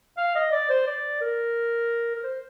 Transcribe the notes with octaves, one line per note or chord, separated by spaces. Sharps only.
F5
D#5
D5
C5
D5
A#4
A#4
C5